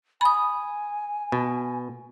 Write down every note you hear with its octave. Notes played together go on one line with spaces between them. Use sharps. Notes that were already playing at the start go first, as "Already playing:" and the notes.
G#5 B5 D#6
B2